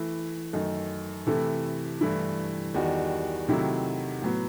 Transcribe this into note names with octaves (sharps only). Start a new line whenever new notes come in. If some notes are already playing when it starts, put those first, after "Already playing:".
Already playing: E3 A3 E4
F#2 D#3 A3 D#4
C3 E3 A3 E4 A4
G2 E3 A3 E4
E2 D#3 G3 D#4 F#4
C3 D#3 F#3 A3 E4
A2 F#3 B3